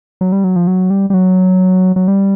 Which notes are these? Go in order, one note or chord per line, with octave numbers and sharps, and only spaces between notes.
F#3
G3
F#3
F3
F#3
G3
G3
F#3
F#3
G3